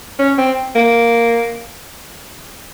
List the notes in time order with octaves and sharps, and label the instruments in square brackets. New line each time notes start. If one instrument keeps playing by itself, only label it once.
[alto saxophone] C#4
C4
A#3